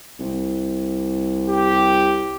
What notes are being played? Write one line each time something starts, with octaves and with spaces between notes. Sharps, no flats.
C2
G4